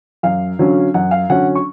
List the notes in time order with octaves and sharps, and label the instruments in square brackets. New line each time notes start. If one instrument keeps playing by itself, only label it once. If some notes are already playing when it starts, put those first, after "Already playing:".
[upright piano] F#2 F5
D3 F#3 C#4
F#2 F#5
F5
D3 F#3 C#4 F#5
C#6